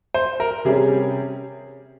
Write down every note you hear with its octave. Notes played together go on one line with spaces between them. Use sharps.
C5
A#4
C3 G3 C#4 G#4